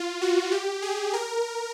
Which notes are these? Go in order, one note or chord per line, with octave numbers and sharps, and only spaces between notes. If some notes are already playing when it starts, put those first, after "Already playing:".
Already playing: F4
F#4
G4
G#4
A#4